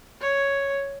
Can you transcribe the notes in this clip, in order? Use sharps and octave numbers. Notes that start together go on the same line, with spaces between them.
C#5